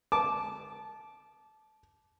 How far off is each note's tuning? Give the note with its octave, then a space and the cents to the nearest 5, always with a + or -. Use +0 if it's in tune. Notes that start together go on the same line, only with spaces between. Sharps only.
A5 -20 D6 +0